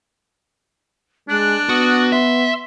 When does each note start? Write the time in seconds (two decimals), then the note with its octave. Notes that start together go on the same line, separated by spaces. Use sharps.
1.29 G#3 D4 F#6
1.69 B3 F#4 D#6
2.12 E5 C6